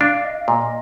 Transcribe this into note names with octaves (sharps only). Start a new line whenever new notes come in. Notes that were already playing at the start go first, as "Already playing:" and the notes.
D4 F5
D#5
F5
A#2 D#5